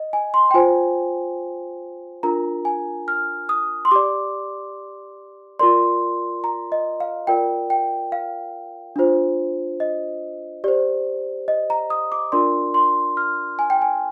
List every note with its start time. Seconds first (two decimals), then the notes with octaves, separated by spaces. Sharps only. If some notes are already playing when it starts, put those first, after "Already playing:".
Already playing: D#5
0.13 G#5
0.34 C6
0.51 G5
0.54 F4 C5 G#5
2.23 D4 F4 A#4 A#5
2.65 G#5
3.08 F6
3.49 D#6
3.85 C6
3.91 G4 D5 D6
5.59 F4 A#4 D5 C6
6.44 A#5
6.72 D#5
7.00 F5
7.27 F4 A#4 D5 G5
7.70 G5
8.12 F5
8.96 D4 F4 C5
9.80 D#5
10.64 G4 C5 D5
11.48 D#5
11.70 A#5
11.90 D#6
12.12 D6
12.32 D4 F4 A#4 D5 C6
12.74 C6
13.17 F6
13.59 G#5
13.70 G5
13.82 G#5